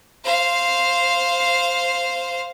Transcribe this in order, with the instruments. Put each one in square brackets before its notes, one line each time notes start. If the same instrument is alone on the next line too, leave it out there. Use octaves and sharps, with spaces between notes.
[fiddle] C5 F5